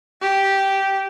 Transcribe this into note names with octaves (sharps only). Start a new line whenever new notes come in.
G4